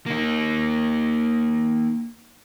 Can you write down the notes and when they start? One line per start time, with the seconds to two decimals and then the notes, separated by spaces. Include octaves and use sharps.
0.06 A#3 D#4